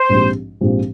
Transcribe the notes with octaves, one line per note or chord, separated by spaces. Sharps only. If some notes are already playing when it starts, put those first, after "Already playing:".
Already playing: C5
A#1 G#2 F3 C4 G4
A#1 G#2 F3 C4 G4